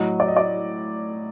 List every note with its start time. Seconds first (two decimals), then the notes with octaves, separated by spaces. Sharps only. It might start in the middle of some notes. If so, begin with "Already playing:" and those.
Already playing: A2 F#3 D#5
0.20 D5
0.28 D#5
0.37 D5